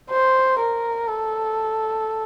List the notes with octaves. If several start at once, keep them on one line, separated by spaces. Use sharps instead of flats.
C5
A#4
A4